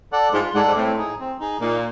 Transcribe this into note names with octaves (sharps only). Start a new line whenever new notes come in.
A4 D5 F#5
G#2 F4
G#2 A4 D5 F#5
G#2
A2 C4
D#4 G#4
C4
D#4 G#4
A#2 D#4